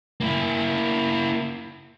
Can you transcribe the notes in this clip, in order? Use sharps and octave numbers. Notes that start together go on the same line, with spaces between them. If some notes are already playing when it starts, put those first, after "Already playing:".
A#3 E4